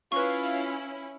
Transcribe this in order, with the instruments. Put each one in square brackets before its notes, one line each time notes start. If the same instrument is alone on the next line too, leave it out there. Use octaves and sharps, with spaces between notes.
[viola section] C#4 E4 [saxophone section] F4 F5 [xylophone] B4 C#6